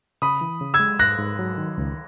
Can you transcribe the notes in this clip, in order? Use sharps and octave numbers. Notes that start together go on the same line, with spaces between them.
C#3 B5 D#6
E3
C#3
E6 G#6
G#3
G#2 F#6 A#6
G#2
F#3
D#3
C#2